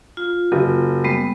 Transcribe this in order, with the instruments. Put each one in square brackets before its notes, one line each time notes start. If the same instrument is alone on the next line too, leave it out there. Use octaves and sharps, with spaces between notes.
[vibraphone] F4
[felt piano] F#1
[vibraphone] G3 G#3 B3